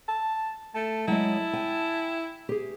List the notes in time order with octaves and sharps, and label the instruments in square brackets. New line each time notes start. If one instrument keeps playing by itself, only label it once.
[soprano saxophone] A5
[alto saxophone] A3 [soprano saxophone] A5
[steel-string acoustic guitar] F#3 G#3 D#5 [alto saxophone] E4
[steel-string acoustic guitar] G5 G#5
G4 G#4